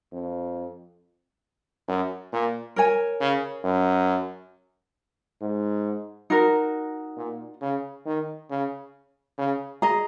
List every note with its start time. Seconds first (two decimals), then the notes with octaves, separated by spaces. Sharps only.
0.13 F2
1.88 F#2
2.33 A#2
2.76 A#4 C#5 G#5
3.20 C#3
3.64 F#2
5.41 G#2
6.30 D#4 F#4 A#4
7.17 A#2
7.61 C#3
8.06 D#3
8.50 C#3
9.38 C#3
9.82 G#4 D#5 A#5